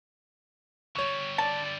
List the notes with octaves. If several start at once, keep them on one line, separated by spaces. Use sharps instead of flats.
D3 G3 C#5 C#6
D5 A5